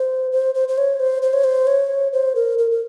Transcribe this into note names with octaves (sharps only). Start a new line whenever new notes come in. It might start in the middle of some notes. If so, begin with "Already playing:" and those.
Already playing: C5
C5
C5
C5
C#5
C5
C5
C#5
C5
C#5
C5
A#4
A#4
A#4